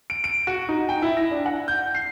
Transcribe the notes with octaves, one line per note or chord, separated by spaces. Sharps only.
D7
D7
F#4
D#4
G5
E4
A#6
D4
F#5
G6
C7